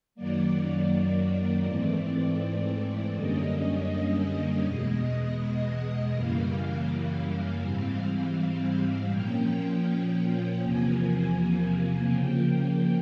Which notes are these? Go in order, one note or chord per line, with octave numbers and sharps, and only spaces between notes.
F#2 D#3 F#3 A#3 D5
G#2 E3 A3 C4 D5
F#2 D3 G3 A#3 C#4 D#5
D#5
E2 B2 G#3
F#2 C#3 E3 G3 A#3 F5
F5
G#2 E3 G3 C4
A#2 F3 A#3 C#4 G5
E2 C3 F3 A#3 G#5
C#3 F3 A#3 G5